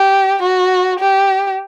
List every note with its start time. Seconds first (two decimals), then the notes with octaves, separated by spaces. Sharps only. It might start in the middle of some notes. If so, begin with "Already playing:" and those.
Already playing: G4
0.42 F#4
0.99 G4